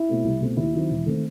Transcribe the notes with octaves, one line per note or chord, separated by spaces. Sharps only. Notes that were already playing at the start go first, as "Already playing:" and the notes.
Already playing: E4
B2 A3 C4
C2
B2 A3 C4
D#2 E4
D#3 F#3 C4
E1
D#3 A3 C4